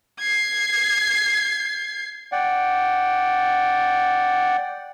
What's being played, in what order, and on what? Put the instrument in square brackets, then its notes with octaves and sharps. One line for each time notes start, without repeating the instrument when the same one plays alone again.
[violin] G#6 C7
[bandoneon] D5 F#5 G5